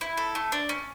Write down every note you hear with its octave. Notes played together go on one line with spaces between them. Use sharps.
E4
A4
A3
D4
C#4